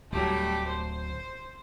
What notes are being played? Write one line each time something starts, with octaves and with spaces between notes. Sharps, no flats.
D1 F#3 G3 A3 G4
C5